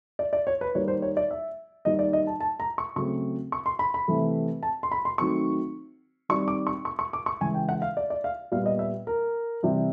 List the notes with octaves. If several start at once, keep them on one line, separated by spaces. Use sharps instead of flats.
D5
D5
C#5
B4
D#3 G3 A#3 C#5
C5
C#5
D5
E5
D#3 G3 A#3 D#5
D5
D#5
A5
A5
A#5
C#6
C#3 F#3 A3 C4 C#6
C#6
C6
B5
B5
C3 E3 A3 C4
A5
C6
B5
C6
D#3 F#3 A3 C4 C#6
D#3 G3 C4 C#6
D6
C#6
C#6
C#6
D6
C#6
C#3 E3 G#3 G#5
G5
F#5
F5
D5
D5
F5
A#2 G3 B3 F5
D#5
E5
A#4
C3 E3 G3 C4